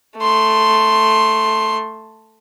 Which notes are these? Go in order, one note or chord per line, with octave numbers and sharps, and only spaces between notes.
A3 C6